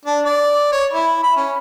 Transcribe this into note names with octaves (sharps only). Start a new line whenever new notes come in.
D4
D5
C#5
E4
B5
C#4